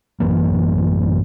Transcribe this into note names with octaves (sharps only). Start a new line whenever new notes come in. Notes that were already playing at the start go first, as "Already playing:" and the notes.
A1 F#2 E3 A#3